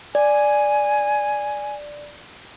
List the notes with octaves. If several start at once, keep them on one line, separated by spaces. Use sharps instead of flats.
D5 G#5